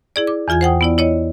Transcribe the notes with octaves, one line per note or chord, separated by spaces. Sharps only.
E4 G#4 D5
D6
E2 E3 F4 G#5 G#6
C5 F#5 G5 D#6
B3 E4 D5
E4 C#5 D#5